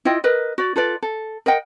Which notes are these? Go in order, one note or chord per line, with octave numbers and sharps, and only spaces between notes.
E4 F4 D#5 G5
A#4 B4 D#5
F#4 D5
F4 A4 B4 D5
A4
A#4 D#5 F#5 G5